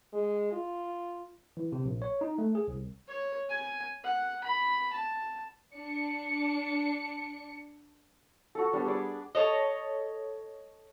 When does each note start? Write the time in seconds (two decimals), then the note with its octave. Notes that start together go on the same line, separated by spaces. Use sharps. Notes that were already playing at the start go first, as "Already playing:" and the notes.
0.13 G#3
0.52 F4
1.57 E3
1.72 C3
1.85 A#1
2.02 C#5
2.21 D#4
2.38 A3
2.55 G#4
2.68 C2
3.08 C#5
3.50 G#5
4.04 F#5
4.44 B5
4.93 A5
5.75 D4 C#7
8.55 F#4 A4
8.73 G3 B3 D4
8.86 G#4 D5
9.35 A4 C#5 D#5